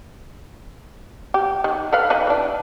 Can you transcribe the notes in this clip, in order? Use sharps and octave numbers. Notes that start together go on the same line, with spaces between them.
G4
D#3
A4 B4 F5
D#3 B4 D#5
E3 D4